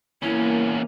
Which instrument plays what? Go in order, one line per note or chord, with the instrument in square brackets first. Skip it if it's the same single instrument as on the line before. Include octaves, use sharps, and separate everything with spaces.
[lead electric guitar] E2 C#4 [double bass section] A#3 [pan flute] E4